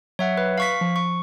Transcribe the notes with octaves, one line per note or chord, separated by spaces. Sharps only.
F#3 C#5 E5 F#5
B4
F5 C#6 B6
F3
C#6